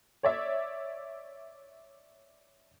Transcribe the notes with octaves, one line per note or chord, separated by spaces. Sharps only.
C#5 D5 E5